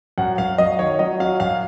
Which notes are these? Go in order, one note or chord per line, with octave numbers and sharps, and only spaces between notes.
F#2 F#5
F#2 F5
F#3 D#5
D#3 C#5
F#3 D#5
F#3 F5
F#2 F5